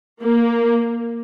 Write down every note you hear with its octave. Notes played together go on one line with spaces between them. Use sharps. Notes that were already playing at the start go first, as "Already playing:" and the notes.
A#3